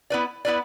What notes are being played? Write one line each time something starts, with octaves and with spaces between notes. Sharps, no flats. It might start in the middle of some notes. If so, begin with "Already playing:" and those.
B3 E4 B4 D5
B3 E4 B4 D5